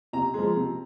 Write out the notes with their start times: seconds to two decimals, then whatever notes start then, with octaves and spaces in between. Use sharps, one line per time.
0.13 C3 A#5
0.34 F3 G#3
0.55 C3